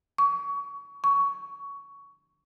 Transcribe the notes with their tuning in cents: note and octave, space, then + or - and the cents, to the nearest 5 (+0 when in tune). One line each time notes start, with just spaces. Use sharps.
C#6 +25
C#6 +15